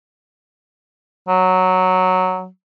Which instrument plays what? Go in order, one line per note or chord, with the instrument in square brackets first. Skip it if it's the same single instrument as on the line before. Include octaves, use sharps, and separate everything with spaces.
[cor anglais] F#3